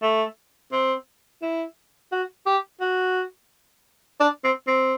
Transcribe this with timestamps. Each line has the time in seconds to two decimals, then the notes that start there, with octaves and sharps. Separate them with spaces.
0.02 A3
0.72 C4
1.42 E4
2.12 F#4
2.46 G4
2.81 F#4
4.20 D4
4.44 C4
4.68 C4